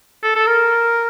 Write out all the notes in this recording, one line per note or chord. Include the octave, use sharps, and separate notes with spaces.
A4
A4
A#4